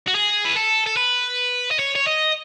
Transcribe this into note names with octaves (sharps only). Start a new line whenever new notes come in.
F#4
G#4
B4
A4
A4
B4
D#5
C#5
C#5
D#5